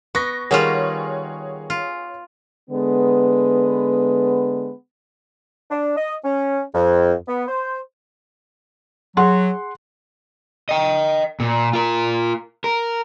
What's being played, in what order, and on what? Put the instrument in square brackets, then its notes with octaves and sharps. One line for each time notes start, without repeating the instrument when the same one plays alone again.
[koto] B3 [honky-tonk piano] C#6 A#6
[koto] D#3 G3 F4 [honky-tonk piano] G#4 C#5 F#5
[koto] F4
[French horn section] D3 G#3 B3
[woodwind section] D4
D#5
C#4
F2
B3
C5
[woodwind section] F#3 [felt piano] G#4 F#5 C6
[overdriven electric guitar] D#5 G5
A#2
F4 A#4
A#4